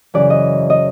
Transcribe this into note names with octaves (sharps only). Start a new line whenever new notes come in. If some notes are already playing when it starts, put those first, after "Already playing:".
F#2 C#3 E3 D5
D#5
D#5